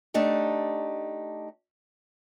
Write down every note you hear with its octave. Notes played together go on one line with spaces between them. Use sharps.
A3 D4 D#4 G4